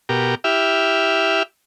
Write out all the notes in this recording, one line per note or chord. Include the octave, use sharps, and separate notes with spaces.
B2 G4 A#4
E4 G4 E5 F6